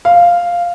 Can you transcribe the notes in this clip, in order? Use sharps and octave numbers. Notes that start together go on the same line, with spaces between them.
F5